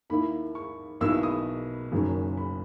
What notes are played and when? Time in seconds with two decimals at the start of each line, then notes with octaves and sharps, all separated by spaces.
0.10 D#2 D#3 A#3 E4 B5
0.55 C#6
1.01 B1 B2 A#3 E4 E6
1.23 D#6
1.92 F#1 F#2 D#3 F#3 C#4
2.37 B5